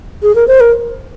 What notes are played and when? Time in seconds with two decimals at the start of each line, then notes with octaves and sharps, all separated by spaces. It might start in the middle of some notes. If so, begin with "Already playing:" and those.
0.23 G#4
0.35 A#4
0.48 C5
0.60 A#4